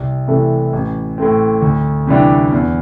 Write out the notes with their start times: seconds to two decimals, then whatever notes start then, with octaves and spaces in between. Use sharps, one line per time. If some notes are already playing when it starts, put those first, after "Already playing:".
Already playing: C2
0.28 C3 E3 A3
0.73 A1
1.18 A2 A3 C4
1.62 D2
2.07 C3 E3 G3 D4
2.52 E2